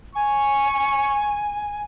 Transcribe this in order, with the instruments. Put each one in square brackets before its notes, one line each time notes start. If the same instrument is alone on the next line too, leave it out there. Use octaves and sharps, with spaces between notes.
[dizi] G#5 [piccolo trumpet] C#6